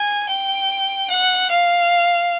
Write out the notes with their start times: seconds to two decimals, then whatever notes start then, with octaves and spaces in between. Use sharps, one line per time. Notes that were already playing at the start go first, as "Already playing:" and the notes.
Already playing: G#5
0.29 G5
1.10 F#5
1.50 F5